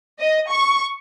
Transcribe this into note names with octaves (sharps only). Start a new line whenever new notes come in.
D#5
C#6